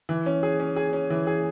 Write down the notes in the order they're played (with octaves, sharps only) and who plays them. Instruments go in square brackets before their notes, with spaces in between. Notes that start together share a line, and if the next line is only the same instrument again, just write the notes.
[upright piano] E3
C#4
G#4
C#4
G#4
C#4
E3
G#4